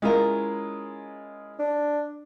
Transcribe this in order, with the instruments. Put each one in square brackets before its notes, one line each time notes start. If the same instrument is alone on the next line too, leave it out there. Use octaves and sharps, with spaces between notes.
[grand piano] G#3 E4 F4 [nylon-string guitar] C#4 G#4 A#4
[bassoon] D4